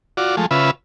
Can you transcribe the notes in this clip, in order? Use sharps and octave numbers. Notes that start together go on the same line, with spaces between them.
F4 F#4 D5
F3 G#3 A3
C#3 F4 B4 E5